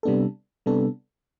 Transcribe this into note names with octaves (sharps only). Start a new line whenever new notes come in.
C3 G3 B3 D4 A4
C3 G3 B3 D4 A4